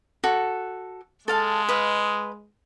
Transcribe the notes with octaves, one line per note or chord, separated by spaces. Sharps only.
F#4 A4
G#3 A4 F5 A5
B4 D#5 F5